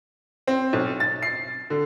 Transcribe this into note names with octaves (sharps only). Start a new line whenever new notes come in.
C4
B1
A6
C7
D3